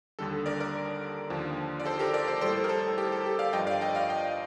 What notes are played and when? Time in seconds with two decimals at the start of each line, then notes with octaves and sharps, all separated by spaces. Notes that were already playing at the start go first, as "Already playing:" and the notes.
0.19 D#2 D3 G3 A4
0.46 A#4 D5
0.60 A#4 D5
1.30 D#2 D3 F3
1.80 D5
1.86 A4 C5
1.99 G4 A#4
2.14 A#4 D5
2.28 A4 C5
2.41 G3 A4 C5
2.46 A2
2.64 A#4
2.69 A4
2.98 G4
3.12 A4
3.26 G4
3.39 D5 F5
3.53 G2 F3 D#5 G5
3.67 D5 F5
3.81 D#5 G5
3.95 D5 F5
4.10 D#5 G5